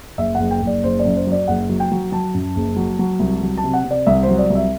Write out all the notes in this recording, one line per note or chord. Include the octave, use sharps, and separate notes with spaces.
F#1 E5
F#1 F#5
G5
F#1
D5
F#1 C5
D5
F#2
C5
F#3
D5
F#1 F#5
F#3
G5
F#3
F#3 A5
F#2
F#1
F#3
F#3
C2
F#3
A5
C3
F#5
C3
D5
C2 E5
C5
F#3
D5
C2
E5